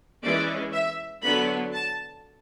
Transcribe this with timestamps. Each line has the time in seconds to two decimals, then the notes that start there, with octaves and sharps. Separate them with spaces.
0.23 E3 G#3 C#4 D5
0.73 E5
1.22 D3 F#3 B3 D4 B5
1.72 A5